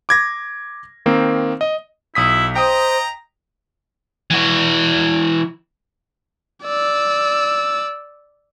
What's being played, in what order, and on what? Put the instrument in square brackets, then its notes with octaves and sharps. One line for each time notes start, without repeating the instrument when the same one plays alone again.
[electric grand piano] D6 G#6 A#6
D#3 A#3 C4
D#5
[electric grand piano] B1 D#6 B6 [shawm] E4
[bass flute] C5 [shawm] D#5 [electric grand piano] G5 D#6 [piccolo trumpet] A#5
[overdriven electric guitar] E3 F#4
[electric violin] D5 E6